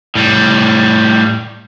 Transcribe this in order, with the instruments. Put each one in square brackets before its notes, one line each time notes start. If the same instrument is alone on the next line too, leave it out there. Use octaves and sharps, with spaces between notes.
[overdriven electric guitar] A2 G3